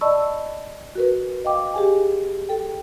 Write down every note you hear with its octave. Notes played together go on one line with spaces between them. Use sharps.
D5 D#5 A5 B5 C#6 E6
F#4 A#4 B4
D#5 F5 G5 D6
G4 G#4 G#5
A4 G5